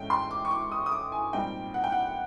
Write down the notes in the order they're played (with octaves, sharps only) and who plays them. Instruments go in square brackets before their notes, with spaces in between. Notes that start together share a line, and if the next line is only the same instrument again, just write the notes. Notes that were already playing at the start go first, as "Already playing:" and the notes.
Already playing: [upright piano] G#2 E3 A3 C#4 G5
C6
D6
C#6
D6
D#6
D#6
D6
G#5
A#2 G3 C4 D#4 G5
F#5
G5
F#5